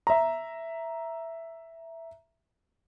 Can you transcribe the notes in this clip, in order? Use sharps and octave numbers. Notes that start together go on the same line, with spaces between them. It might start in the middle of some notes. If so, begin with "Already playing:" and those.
E5 A#5